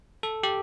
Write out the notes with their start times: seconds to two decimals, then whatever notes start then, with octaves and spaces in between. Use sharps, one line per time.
0.23 A4
0.43 G4